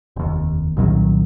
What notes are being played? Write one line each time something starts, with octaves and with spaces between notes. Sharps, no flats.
F1 D#2
C2 A#2 D#3 F#3